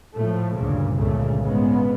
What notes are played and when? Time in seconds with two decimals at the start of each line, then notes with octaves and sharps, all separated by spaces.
0.16 A2 F3 A3
0.55 D2 G2 A#2 C#3
0.95 G1 C#2 A#2 C#3 A3
1.42 G#1 G#2 C#3 G#3 B3